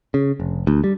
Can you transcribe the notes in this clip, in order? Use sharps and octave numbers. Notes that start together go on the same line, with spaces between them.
C#3
F1
D2
G3